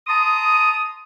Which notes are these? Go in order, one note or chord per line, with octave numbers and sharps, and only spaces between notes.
A5 A#5 C6 D#6